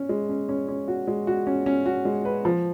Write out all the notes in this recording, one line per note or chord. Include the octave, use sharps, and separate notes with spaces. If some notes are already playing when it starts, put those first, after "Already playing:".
Already playing: C#4
G#3
C#4
C#4
C#4
F#4
G#3
F#4
C#4
C#4
F#4
G#3
B4
F3